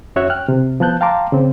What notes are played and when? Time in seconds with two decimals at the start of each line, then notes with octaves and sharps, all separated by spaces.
0.16 F2 C#4 F#4 C#5 E5 F#6
0.30 G5 F6 F#6
0.48 C3
0.80 F3 B3 A5 F#6 G6
1.01 F5 G5 A5 A#5 C6 D6
1.32 C#3 C4